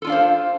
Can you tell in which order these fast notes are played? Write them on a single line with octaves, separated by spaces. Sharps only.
A4 F4 D4 F5 C5